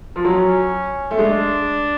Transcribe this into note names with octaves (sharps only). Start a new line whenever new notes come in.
F3
F#3 C#4
A3
G#3 D4